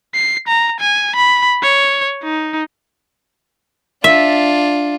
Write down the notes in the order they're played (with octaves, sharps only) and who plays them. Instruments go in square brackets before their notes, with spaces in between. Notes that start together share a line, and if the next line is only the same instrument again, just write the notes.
[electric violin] C7
A#5
G#5
B5
C#5
D#4
[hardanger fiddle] D4 F4 [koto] E5